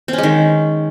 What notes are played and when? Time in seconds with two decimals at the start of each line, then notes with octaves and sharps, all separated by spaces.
0.08 C4
0.13 C#4
0.18 G#3
0.23 D#3